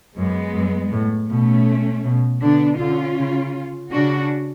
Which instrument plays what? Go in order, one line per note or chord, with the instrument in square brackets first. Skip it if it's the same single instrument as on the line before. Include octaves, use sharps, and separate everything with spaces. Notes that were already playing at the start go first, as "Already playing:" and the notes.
[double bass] F#2 [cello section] G#3 B3
[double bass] F#2
A2
[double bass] B2 [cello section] A3 C#4
[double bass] B2
[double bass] D3 [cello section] B3 D4
[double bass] D3 [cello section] C#4 F4
[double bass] C#3
[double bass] C#3 [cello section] D4 F#4